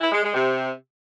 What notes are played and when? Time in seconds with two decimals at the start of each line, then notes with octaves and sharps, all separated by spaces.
0.01 E4
0.12 G#3
0.23 G#3
0.34 C3